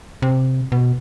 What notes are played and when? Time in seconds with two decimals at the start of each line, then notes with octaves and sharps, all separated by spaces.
0.22 C3
0.72 B2